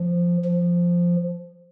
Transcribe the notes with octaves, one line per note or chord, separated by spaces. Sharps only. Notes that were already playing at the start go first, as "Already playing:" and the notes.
Already playing: F3
F3